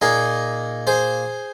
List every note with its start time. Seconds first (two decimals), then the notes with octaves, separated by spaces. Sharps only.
0.01 A#2 A#3 D#4 G#4
0.87 G#4 C5